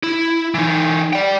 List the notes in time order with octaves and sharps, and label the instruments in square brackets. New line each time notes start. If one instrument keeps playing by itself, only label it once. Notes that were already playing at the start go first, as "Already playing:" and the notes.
[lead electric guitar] E4
E3 D#4
D5 G5